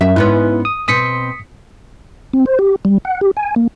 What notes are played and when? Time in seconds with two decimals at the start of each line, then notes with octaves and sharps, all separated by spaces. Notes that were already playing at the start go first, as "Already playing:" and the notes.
0.01 F#2 E5
0.16 G#2 B3 C#4 E4 B4
0.65 D#6
0.88 B2 C4 D#6 B6 C#7
2.33 C4
2.46 C5
2.59 G4
2.85 G3
3.05 F#5
3.21 G4
3.37 G#5
3.56 A#3